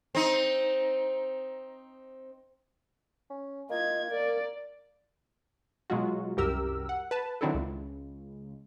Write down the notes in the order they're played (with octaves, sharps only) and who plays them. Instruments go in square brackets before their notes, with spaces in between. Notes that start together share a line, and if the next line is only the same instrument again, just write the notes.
[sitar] C4 D#4
[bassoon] C#4
[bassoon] A#3 [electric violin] F4 G#6 [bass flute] D#5
[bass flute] A#4 [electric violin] D5
[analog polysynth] B2 F#3 G#3 F4 F#4
C2 F#2 G4 A#4 E6
F#5
B4 A5
D#3 F#3 C4 D4 E4 A4
C#2